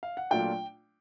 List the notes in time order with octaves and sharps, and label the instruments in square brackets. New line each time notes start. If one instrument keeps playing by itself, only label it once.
[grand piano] F5
F#5
A#2 F#3 A3 D4 F4 G5